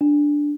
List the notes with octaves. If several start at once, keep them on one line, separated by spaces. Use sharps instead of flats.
D4